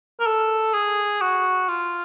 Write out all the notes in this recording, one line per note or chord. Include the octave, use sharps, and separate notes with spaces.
A#4
A4
G#4
F#4
F4